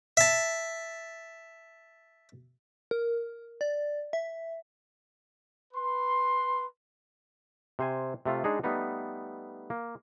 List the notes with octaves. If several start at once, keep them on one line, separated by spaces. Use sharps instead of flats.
E5 A5
A#4
D5
E5
B4 C6
C3 C5 G#5
C3 A3 F4
G#3 D4 D#4 G#4
G3 A3 B3 D#4
A#3